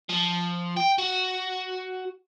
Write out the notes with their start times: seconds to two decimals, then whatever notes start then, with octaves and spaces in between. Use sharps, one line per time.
0.10 F3
0.77 G5
0.98 F#4